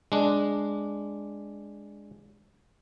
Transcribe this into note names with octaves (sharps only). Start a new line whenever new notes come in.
G#3 D4